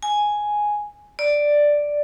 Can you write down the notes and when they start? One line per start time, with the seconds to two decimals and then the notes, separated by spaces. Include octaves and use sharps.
0.03 G#5
1.19 D5